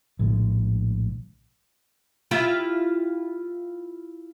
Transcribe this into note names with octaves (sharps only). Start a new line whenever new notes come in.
A#1 A2 D3 G#3
E4 F4 G4